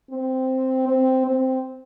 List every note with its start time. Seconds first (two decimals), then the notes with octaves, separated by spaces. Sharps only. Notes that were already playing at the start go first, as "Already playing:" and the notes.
0.11 C4
0.88 C4
1.26 C4